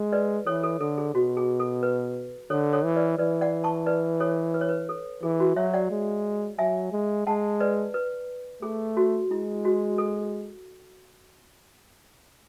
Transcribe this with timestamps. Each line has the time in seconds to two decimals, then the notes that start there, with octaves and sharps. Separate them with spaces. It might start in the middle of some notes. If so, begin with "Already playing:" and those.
Already playing: G#3
0.13 B4 D5
0.47 E3 A4 C#5
0.63 A4
0.80 D3 A4
0.98 G#4
1.14 B2 F#4
1.37 G#4
1.60 A4
1.83 B4
2.50 D3 A4 C#5
2.73 A4 C#5
2.84 E3
2.96 B4 D5
3.18 E3 B4 D5
3.41 D5 F#5
3.64 A5 C#6
3.86 B4 D5
4.20 A4 C#5
4.54 B4
4.61 C#5
4.69 B4
4.89 A4
5.23 E3 G#4
5.40 F#4
5.56 F#3 C#5 E5
5.74 D5 F#5
5.91 G#3
6.58 F#3 E5 G#5
6.92 G#3
7.27 G#3 F#5 A5
7.60 B4 D5
7.94 B4
8.62 A3 G#4
8.97 F#4
9.30 G#3 E4
9.65 F#4
9.98 A4